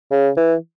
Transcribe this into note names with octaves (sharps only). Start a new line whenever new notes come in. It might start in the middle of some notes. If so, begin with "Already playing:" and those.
C#3
E3